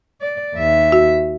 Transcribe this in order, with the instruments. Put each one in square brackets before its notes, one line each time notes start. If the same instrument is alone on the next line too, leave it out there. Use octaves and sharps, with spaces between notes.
[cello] D5
D#2 E5
[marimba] F#4